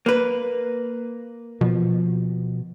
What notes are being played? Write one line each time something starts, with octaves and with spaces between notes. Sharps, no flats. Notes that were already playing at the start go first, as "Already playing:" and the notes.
A#3 B4
B2 F3